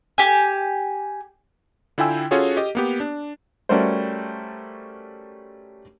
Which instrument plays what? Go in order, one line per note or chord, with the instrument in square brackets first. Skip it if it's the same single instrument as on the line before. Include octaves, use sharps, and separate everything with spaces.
[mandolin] G4 G#5
[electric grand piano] D3 E4 F4 G5 G#5 E6
C#4 F4 F#4 G#4 A4 C#5
G4 D#5
A#3 B3 G4
D4
[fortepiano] G3 A3 C#4 F#4 A#4 C5